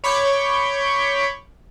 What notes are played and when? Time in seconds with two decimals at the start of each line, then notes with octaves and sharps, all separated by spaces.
0.04 C#5 B5 C#6 D6 G6